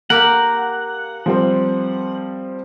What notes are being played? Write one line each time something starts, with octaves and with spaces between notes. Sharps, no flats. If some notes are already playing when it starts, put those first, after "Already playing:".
A#3 G4 A#4 F#5
F3 G3 C4